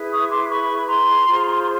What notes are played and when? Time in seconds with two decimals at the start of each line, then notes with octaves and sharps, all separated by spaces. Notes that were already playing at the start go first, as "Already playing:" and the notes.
Already playing: E4 G#4 B4
0.11 C#6 D#6
0.30 C6 D6
0.45 C6
0.49 B5 C#6
0.77 B5
0.87 A#5 C6
1.27 F4 G#4 C5